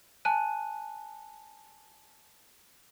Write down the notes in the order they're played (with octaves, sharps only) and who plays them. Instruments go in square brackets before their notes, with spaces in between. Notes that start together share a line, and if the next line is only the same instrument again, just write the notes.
[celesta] G#5 A5 F#6 D#7